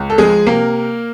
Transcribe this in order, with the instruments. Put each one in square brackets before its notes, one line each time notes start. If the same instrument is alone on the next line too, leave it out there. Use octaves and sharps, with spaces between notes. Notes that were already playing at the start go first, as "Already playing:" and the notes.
Already playing: [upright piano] C#2
A4
F3 G#3 G#4
C3 A#3 A#4